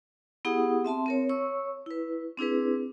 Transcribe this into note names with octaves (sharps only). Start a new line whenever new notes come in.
B3 E4 G4 G#4 F#5 D#6
C4 E5 A5 C6
C4 A#4 C#5
C#5 C#6 E6
E4 B4
C4 D4 E4 G#4 B4